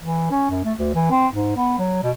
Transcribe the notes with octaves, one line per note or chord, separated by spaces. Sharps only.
E3
C#4
F#2
A3
D2
E3
C4
G#2
B3
F#3
B2